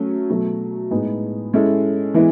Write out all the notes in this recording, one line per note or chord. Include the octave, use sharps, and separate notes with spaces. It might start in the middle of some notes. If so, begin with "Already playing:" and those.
Already playing: F#3 A3 C#4
B2 F#3 A3
A2 G#3 B3 D#4 G#4
G#3 C#4 E4 A4
E3 G#3 B3 E4